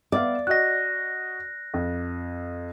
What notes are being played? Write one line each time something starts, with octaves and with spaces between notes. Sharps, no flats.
B3 D5 E5 F5
F#4 D#5 F#6 A#6
F2